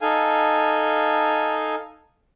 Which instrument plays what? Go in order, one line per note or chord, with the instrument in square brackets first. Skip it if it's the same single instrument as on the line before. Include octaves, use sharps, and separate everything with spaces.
[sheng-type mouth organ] D#4 A4 F5 G#5